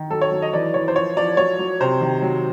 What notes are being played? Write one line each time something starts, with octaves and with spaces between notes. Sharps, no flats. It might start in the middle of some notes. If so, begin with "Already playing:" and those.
Already playing: D#3
F#3 A4
C#5
F#3
D#5
E3 D5
E3 C#5
C5
F3 C#5
F3 D5
F#3 C#5
F#3
C3 C5
D#3
F#3